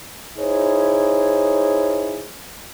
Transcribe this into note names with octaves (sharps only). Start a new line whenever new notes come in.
D#4 E4 G#4 C5 C#5